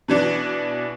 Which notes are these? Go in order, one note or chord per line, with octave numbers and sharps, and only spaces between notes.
B2 E3 D4